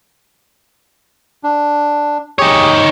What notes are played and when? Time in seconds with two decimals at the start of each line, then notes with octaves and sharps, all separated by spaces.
1.44 D4
2.39 D#4 G4 G#4 C#5